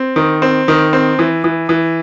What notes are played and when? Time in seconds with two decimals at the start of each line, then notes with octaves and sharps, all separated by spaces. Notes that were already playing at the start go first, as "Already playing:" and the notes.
Already playing: C4
0.16 D#3
0.42 C4
0.68 D#3
0.93 C4
1.19 E3
1.44 E3
1.69 E3